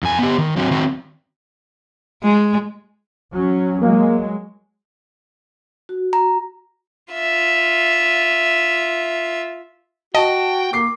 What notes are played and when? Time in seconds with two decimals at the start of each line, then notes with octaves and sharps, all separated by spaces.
0.03 F2 G#5
0.19 B3 G4
0.38 D#3
0.56 F#3 C4 F#4
0.71 D#3 F#3 C4 F#4
2.23 G#3
3.33 F#3 C#4
3.82 F#3 G#3 A#3
5.89 F#4
6.13 A#5
7.13 F4 E5
10.15 F#4 D#5 G5 A5
10.73 A#3 D6 C7